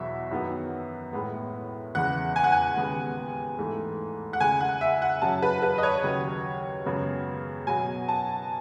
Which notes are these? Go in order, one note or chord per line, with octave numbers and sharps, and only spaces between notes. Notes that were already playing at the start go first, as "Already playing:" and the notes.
Already playing: E2 B2 F#3 E5
F#2 D#3 F#3 B3
A2 G#3 B3
E2 C#3 G#3 B3 F#5
G#5
F#5
G#5
D#2 C#3 G#3 B3
G#2 E3 A3
F#5
C#2 C#3 G#3 G#5
F#5
E5
F#5
F#2 C#3 F#3 A5
B4
B4
D#5
C#5
D#2 C#3 F#3
F#2 C#3 G#3 B3
B2 F#3 B3 G#5
A5